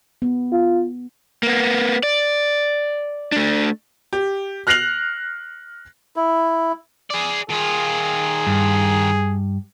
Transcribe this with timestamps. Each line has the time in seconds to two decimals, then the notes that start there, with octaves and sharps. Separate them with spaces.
0.22 B3
0.52 F4
1.43 A#3 B3
2.03 D5
3.32 A3 D4
4.13 G4
4.67 F6 F#6 A#6 C7 F7 F#7
6.16 E4
7.11 G#4 D5
7.50 D#3 F4 G#4
8.47 G2